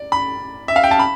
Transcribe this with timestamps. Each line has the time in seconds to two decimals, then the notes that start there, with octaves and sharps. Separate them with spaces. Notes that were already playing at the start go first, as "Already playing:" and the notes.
Already playing: D5
0.12 B5
0.68 E5
0.76 F5
0.84 G5
0.91 A5
0.99 B5